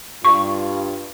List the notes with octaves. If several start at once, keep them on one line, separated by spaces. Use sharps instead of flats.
G2 F4 C#6